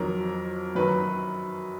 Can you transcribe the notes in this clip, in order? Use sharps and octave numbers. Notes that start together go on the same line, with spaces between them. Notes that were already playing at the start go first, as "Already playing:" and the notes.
Already playing: F2 D#3 F#3 A#4
F#2 D#3 F#3 B4